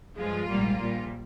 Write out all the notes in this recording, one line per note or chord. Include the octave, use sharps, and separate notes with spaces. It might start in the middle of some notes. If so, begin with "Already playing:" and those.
G2 F3 G#3 F4
A#1 G#2 G3 A#3
A#1 A#2 G3